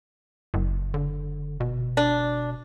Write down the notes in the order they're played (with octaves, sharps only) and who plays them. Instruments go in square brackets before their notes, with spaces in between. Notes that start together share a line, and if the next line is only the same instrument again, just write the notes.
[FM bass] F#1
[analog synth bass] D3
B2
[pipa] D4